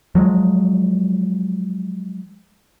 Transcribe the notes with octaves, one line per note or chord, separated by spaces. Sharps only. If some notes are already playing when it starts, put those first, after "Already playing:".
F3 F#3 G#3